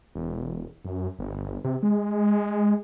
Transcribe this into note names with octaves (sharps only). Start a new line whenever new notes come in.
E1
F#2
G1
C3
G#3